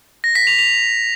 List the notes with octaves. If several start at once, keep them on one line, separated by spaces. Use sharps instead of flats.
A#6
B6
F7
F7